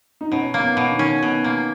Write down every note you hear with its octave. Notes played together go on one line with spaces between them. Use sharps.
D#4
B2 C#4
A#3
B3
B2
D#3
C#4
B2 B3
A#3